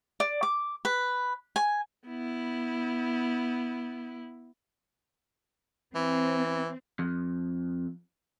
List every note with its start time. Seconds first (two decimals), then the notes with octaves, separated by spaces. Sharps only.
0.20 D5
0.43 D6
0.85 B4
1.56 G#5
2.07 B3 E4
5.95 E3 C4
6.99 F2